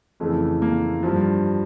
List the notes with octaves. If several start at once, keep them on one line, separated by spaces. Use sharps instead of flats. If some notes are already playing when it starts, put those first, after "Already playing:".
F2 C#3 E3 A3
A#3
G2 F3